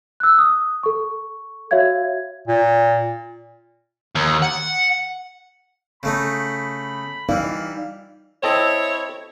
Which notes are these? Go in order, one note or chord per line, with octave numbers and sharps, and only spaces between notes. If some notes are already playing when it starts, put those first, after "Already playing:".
E6 F#6
D#6
A4 C#6
F#4 C#5 E5 F5 G#6
A#2
D#2
F#5
C#3 A3 D#4 B5
E3 G3 D#4 D5 F5
C4 E4 A4 C#5 D#5